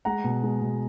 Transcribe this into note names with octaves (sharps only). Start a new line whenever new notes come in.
G#3 F#5 A#5
B2
G#3
B2